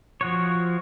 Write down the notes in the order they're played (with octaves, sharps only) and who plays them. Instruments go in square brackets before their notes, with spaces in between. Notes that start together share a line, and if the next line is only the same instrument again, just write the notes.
[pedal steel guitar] F3 F#4 C#5